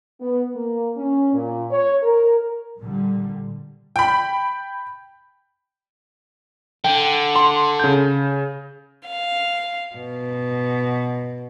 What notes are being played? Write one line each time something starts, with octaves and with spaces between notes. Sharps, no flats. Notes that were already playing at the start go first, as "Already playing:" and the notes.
B3
A#3
C#4
A#2
C#5
A#4
A#2 D3 G3
G5 B5
D3 G5
C6
C#3 G6
F5
B2